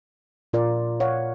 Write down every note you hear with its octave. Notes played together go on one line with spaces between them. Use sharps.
A#2 F4 A#4 D5
C#5 F5 F#5